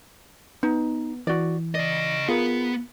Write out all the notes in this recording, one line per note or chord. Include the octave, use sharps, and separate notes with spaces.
B3 D#4
E3 F#4 D5
C#3 D5 D#5
B3 F4 G#4 A#4